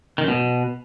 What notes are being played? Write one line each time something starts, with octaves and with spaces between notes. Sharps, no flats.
D#3
F#2
B2